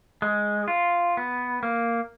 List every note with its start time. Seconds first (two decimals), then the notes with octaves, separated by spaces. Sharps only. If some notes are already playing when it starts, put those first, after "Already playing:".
0.22 G#3
0.68 F4
1.17 B3
1.63 A#3